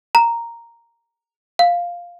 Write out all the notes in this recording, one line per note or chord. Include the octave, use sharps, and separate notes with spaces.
A#5
F5